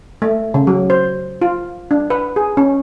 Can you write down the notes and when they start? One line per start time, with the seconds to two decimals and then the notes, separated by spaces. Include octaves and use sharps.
0.22 A3
0.54 C#3
0.67 F#3
0.90 C5
1.42 F4
1.91 D4
2.10 B4
2.36 G#4
2.57 C#4